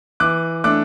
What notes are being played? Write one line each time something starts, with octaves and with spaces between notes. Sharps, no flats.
E3 D6 F#6
A3 D4 D6 F#6